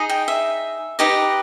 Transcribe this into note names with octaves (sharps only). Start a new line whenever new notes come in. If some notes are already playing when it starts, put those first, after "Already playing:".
Already playing: D#4 G#4 D#5
G5
E5
D#4 G4 B4 D#5